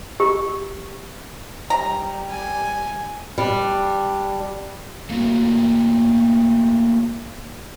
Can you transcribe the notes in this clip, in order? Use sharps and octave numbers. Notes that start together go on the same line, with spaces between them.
G4
G3 A#5
G#5
G3 D4
A3 A#3 E4 F#4